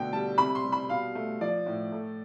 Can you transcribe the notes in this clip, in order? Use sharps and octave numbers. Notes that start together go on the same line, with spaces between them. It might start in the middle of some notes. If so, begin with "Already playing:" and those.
Already playing: B2 D3 A3 G5
G3 A5
C3 B5
C6
G3
B5
B2 F5
A3
F3 D5
A2
A3